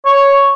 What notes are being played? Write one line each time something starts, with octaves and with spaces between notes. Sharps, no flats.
C#5